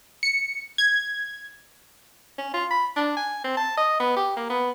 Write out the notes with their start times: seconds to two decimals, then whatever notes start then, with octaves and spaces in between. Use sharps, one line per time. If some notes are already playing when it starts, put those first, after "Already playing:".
0.23 C#7
0.78 G#6
2.38 C#4
2.54 F4
2.71 B5
2.96 D4
3.17 G#5
3.44 C4
3.57 A5
3.77 D#5
4.00 B3
4.17 G4
4.37 A#3
4.50 B3